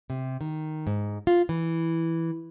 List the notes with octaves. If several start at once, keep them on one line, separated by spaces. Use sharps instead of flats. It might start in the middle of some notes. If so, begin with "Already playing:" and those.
C3
D#3
G#2
F4
E3